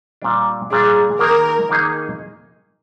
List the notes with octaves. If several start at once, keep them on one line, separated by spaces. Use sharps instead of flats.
A#2 G3 D4
A#2 G3 D4 G#4
D#3 A#3 D#4 G#4 A#4
D#3 A#3 D#4 G#4